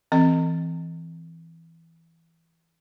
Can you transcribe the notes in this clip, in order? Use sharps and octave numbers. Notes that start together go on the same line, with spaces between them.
E3 C4 D#5